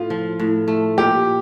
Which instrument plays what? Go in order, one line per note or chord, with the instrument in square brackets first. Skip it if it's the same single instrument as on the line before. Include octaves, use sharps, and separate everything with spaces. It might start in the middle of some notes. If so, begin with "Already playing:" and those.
Already playing: [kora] A2 [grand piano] F4
[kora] F3
A2
A3
[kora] A#2 [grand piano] G4